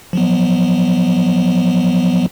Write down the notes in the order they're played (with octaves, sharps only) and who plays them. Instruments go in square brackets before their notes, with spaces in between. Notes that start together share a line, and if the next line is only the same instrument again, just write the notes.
[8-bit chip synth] F3 F#3 B3